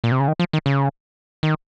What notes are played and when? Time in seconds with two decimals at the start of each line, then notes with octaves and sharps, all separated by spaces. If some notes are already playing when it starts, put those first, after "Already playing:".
0.04 A#2
0.11 C3
0.20 C#3
0.28 D#3
0.39 F3
0.53 D#3
0.66 C#3
1.43 D#3